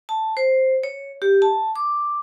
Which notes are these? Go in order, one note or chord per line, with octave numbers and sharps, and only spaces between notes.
A5
C5
C#5
G4
A5
D6